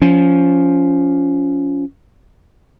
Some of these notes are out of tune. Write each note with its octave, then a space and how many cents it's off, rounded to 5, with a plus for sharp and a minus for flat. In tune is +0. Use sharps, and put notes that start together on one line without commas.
F3 +0 C#4 +20